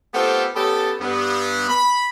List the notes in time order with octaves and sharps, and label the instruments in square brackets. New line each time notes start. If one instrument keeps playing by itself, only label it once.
[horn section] A3 B3 C4 F4 G4 A4
B3 C#4 G4 A4
G2 B3
B5